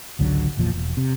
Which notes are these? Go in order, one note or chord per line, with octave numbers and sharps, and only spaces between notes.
G#1 C#2 D3 F#3
G#1 E2 A#2 F3
E1
C3